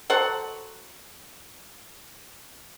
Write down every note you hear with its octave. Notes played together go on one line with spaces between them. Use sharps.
F#3 A4 C5 F#5